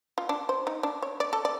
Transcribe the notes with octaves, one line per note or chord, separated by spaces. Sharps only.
F4
D4
C5
D#4
D4
C#5
D5
A4
D5